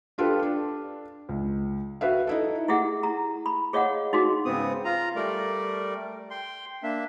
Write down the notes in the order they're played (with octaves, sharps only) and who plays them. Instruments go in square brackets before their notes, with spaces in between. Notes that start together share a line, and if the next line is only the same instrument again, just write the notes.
[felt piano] D4 F4 G4 A4 B4
D4 A4
C#2
F#4 B4 E5 F5
D#4 E4 A4
[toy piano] E4 G4 G#4 E5 F#5
A#5
B5
G#4 C#5 D#5 F5 F#5
D#4 F#4 G#4
[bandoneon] G#2 C#3 B3 C4 D#6
F4 A#5
G3 A3 A#4 D5
G5 C6
A#3 D4 E5